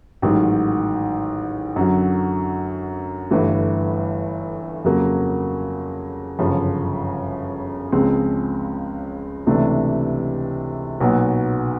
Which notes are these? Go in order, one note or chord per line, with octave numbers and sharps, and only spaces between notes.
A1 G#2 D#3 F#3
F#2 D3 F#3
G1 G2 E3 A3
F2 C#3 F#3 A#3
G1 F#2 C#3 F3
C#2 C#3 F3 G#3 C4
C#2 C3 E3 A3 D4
B1 A#2 F#3 B3